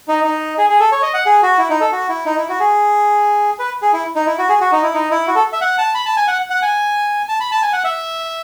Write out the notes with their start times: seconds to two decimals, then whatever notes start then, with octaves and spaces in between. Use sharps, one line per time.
0.08 D#4
0.24 D#4
0.58 G#4
0.70 G#4
0.80 A4
0.92 C#5
1.02 D#5
1.14 F#5
1.26 G#4
1.42 F#4
1.58 E4
1.70 D#4
1.81 A4
1.92 F#4
2.09 E4
2.26 D#4
2.37 E4
2.49 F#4
2.60 G#4
3.59 B4
3.82 G#4
3.93 E4
4.16 D#4
4.26 E4
4.38 F#4
4.49 G#4
4.61 F#4
4.72 D#4
4.83 E4
4.94 D#4
5.11 E4
5.27 F#4
5.35 A4
5.52 E5
5.61 F#5
5.78 A5
5.94 B5
6.06 A5
6.17 G#5
6.28 F#5
6.50 F#5
6.62 G#5
7.28 A5
7.40 B5
7.51 A5
7.62 G#5
7.73 F#5
7.84 E5